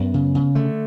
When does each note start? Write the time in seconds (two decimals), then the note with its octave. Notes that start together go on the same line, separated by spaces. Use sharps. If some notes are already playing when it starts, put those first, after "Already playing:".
Already playing: F#2 B3
0.14 C#3
0.35 C#3
0.55 D3 A3